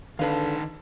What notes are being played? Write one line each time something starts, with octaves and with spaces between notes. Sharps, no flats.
D3 D#3 D#4 B4 F5 A5